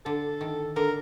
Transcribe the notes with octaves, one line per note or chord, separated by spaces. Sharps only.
D3 A4
D#3
D3 A#4